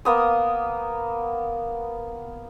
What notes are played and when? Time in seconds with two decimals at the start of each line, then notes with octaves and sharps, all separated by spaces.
0.05 A#3 B3 D#6